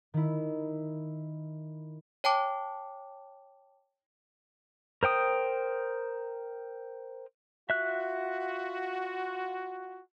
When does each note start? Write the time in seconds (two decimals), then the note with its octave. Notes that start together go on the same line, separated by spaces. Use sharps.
0.14 D#3 E4
2.24 C#5 G5 A5 D6
5.03 A#4 C5 G5 D#6
7.70 F4 F#4 E5 F#6